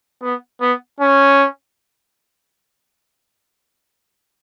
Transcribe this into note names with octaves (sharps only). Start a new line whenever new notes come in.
B3
B3
C#4